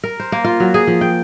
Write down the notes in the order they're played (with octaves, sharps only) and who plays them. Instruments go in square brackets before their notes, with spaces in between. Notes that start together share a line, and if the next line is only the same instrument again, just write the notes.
[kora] A#4
C5
A#3
F4
F#3
G#4
F3
G5